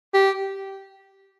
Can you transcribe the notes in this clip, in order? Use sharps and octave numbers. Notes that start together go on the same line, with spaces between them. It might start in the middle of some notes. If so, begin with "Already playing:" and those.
G4